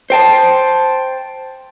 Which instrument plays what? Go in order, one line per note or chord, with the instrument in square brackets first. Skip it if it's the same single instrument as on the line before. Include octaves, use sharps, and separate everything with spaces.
[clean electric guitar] C5 G5 A5